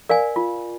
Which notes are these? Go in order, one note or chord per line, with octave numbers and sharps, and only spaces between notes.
A#4 D5 F5 G#5
F4